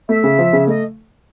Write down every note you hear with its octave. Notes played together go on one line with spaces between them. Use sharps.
A3 E5
C#3
F3
C#3
A3 D#5